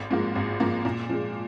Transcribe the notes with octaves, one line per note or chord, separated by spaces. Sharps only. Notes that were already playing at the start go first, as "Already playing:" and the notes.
Already playing: G#1
G#2 F3 A#3
G#1
G#2 F3 A#3
A#2
F3 G#3